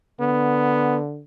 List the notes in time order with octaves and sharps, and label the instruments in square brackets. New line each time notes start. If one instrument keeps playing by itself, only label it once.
[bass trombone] D3 [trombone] B3